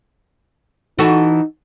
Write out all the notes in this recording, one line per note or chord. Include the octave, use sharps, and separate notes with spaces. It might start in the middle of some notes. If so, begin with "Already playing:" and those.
E3 D#4 F#4 A4